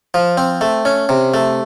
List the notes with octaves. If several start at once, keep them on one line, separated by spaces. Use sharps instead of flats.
F3
C4
A3
C#4
C3
A3